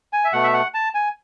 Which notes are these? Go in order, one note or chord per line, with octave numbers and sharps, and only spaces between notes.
G#5
E5
B2 A3 F#5
E5
F#5
A5
G#5